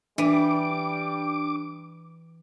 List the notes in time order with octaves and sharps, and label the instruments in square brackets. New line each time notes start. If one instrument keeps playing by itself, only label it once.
[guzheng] E3 [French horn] G3 [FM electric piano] D4 [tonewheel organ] D6